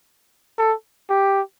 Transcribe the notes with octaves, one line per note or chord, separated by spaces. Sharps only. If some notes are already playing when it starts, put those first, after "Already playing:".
A4
G4